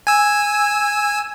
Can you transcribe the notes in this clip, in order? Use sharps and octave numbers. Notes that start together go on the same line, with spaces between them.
G#5 E6